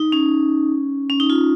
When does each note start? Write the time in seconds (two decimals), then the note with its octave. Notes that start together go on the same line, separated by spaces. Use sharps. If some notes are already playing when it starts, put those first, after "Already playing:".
Already playing: D#4
0.12 C#4
1.10 C#4
1.20 D#4
1.30 F4